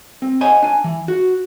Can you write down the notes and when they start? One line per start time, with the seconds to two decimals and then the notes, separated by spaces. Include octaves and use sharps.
0.22 C4
0.41 C5 C#5 D#5 F#5 G#5
0.62 D4 G#5
0.84 E3
1.08 F#4